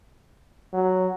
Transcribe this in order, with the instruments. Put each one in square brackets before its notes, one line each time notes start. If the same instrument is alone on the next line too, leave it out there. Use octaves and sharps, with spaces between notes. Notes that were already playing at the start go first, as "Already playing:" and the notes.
[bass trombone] F#3